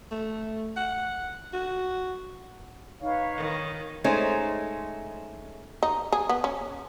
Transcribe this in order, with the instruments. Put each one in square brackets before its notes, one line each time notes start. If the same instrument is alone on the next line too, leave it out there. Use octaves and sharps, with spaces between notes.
[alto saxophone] A3
F#5
F#4
[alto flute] D#4 [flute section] B4 F5 [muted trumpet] C#5
[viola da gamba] D#3
[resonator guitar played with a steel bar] G#3 A3 C#4 D#4 C5
[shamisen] D#4
G#4
B3
C#4